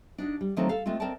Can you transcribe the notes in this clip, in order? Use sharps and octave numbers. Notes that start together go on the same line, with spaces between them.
D4 D#4 F#4
G3
D#3 F3 F#3 A3 C4 D#4
A4 F5
G#3 A3 C4 F4
C4 A#4 D5 D#5 G5 A5